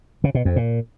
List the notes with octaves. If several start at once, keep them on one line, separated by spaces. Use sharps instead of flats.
C#3
B2
F2
A#2